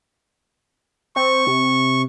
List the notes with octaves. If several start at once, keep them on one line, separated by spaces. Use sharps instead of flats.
C4 C#6
C3